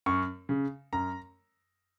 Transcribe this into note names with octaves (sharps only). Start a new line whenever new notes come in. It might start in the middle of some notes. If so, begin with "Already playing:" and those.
F#2 C#6
C#3
F#2 A#5